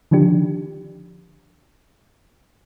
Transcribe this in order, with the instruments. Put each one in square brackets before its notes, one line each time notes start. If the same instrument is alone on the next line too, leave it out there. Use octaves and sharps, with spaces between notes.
[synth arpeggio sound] D3 D#3 F3 D4 G4